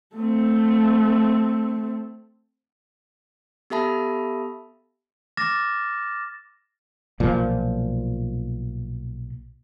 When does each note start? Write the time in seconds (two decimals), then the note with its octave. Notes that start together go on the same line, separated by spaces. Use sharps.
0.15 A3 C4
3.70 B3 G4 A4 E5 A5 B5
5.37 D6 F6 A6 A#6 E7
7.20 B1 A#2 F3